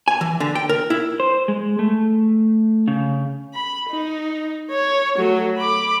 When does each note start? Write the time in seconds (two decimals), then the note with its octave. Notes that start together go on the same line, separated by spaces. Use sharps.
0.08 G#5
0.21 E3
0.40 D3
0.55 G5
0.69 A#4
0.90 E4
1.20 C5
1.48 G#3
1.79 A3
2.88 C#3
3.54 B5
3.89 D#4
4.70 C#5
5.17 F#3 A3
5.58 B5 D6